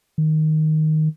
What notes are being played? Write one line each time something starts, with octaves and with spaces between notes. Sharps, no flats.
D#3